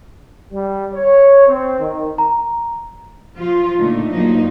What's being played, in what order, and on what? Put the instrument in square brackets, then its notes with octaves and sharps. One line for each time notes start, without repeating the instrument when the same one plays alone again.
[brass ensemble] G3
C#5
C4
D#3
[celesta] A#5
[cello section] F3 F4
A#2 D3 A3 D#4
G2 F3 F#3 A#3 D#4